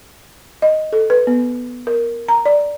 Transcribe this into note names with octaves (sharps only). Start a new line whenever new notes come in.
D#5
A4
B4
B3
A#4
A#5
D5